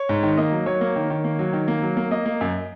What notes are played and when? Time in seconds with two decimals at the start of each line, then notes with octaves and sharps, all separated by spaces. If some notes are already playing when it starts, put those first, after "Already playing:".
Already playing: C#5
0.09 G#2
0.23 D#3
0.37 A#3 D#5
0.52 F#3
0.66 F#3 C#5
0.81 A#3
0.96 D#3
1.10 D#3
1.24 A#3
1.39 F#3
1.53 D#3
1.68 A#3
1.82 F#3
1.97 A#3
2.11 A#3 D#5
2.25 A#3
2.41 F#2